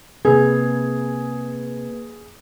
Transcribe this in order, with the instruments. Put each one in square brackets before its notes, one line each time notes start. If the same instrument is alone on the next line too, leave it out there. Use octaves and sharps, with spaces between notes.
[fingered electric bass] C3 C4 [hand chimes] A#3 B4 G#6 [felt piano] G#4